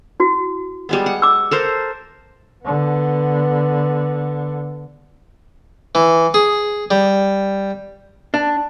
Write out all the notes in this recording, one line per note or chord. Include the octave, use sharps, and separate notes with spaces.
E4 F#4
G3 G#3 B3
F#5
D6 E6
A4 A#4 C5
D3 B3
E3
G#4
G3
D4